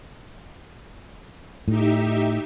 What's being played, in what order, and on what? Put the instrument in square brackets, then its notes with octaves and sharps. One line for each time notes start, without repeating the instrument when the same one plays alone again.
[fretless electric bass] A2 [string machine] D#4 G4 E5